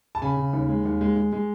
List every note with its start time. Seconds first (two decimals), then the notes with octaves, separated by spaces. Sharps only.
0.15 A5
0.22 C#3 G#5 B5
0.37 C#3
0.53 D#2
0.69 G#3
0.85 D#2
1.01 G#3
1.16 G#3
1.33 G#3